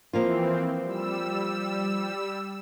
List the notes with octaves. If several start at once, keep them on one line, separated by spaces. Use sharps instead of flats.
E3 F3 A#3 C4 F4
G3 E6